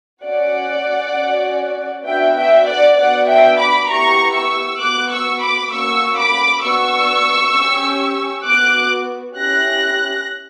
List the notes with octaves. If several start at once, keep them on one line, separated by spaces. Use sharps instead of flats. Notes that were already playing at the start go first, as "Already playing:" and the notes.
C#4 F#4 D5 F#5
C#4 F#4
B3 D4 F#4 E5 G5
E5 G5
D5 F#5
B3 D4 F#4 D5 F#5
E5 G5
B5 D6
B3 E4 G4 A#5 C#6
C#6 E6
B3 F#4 D6 F#6
C#6 E6
B5 D6
A#3 C#4 F#4 C#6 E6
B5 D6
B3 D4 F#4 C#6 E6
C#4 G4
B3 F#4 D6 F#6
C#4 E4 G4 F#6 A#6